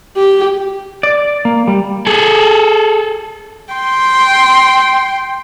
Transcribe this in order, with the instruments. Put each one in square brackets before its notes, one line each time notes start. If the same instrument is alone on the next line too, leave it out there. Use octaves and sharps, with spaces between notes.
[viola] G4
[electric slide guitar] D5
A#3
G3
[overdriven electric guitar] G#4 A4
[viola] G5 C6